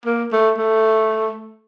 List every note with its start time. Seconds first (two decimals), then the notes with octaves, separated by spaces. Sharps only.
0.06 A#3
0.32 A3
0.58 A3